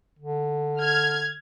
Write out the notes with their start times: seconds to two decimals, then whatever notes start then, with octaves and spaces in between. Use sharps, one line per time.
0.19 D3
0.81 F6 G#6